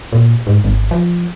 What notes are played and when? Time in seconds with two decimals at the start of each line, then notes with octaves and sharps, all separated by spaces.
0.12 A#2
0.47 G#2
0.64 G#1
0.91 F3